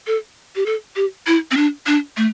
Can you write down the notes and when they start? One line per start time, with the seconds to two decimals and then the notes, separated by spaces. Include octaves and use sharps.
0.07 A4
0.56 G4
0.66 A4
0.96 G4
1.27 E4
1.51 C4
1.57 D4
1.87 D4
2.17 A3